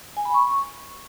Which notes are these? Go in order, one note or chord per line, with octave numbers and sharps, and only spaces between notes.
G#5
B5
C#6